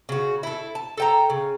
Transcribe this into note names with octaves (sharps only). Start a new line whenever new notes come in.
C#3 F#4
E4 A4
A5
A4 G5 A#5
C#3